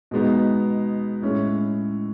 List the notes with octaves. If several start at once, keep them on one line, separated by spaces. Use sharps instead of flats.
B2 G#3 B3 D#4
A2 G#3 C#4 E4